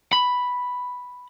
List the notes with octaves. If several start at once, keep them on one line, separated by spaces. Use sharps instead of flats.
B5